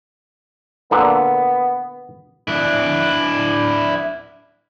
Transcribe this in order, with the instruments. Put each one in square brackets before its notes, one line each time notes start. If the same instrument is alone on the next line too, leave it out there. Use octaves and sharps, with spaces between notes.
[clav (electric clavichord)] A#2 D3 [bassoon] B3
[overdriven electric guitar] D4 E4